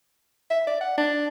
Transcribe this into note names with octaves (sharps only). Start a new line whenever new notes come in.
E5
D5
F#5
D4